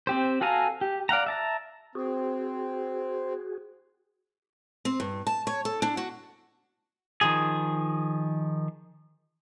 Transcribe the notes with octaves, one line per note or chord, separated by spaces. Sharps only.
C4 G4 C5
F#4 A4 F5 G#5 A#5
G4
D5 F5 F#5 A#5
E5 A5 A#5
C4 F#4 G#4
C4
G2
A5
C#5
A4
D4
F#4
D#3 F3 G#4